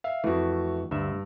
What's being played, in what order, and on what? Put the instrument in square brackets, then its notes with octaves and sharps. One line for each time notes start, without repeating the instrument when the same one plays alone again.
[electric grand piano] E5 F5
[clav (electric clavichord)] F2 E3 [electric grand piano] A3 F#4
[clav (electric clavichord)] D2 E5 [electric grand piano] G2